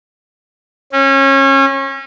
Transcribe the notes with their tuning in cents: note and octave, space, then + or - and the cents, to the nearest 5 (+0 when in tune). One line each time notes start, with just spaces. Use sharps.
C#4 -25